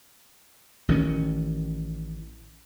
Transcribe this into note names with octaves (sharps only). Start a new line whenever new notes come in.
A1 D#3 C#4